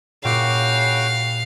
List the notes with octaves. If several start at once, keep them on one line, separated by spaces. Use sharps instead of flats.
A#2 C#3 F#4 E5 F5 G5 D6